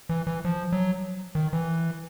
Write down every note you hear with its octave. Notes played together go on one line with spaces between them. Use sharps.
E3
E3
F3
F#3
D#3
E3